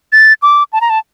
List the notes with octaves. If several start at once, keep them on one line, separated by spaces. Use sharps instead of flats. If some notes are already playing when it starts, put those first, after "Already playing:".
A6
D6
A5
A#5
A5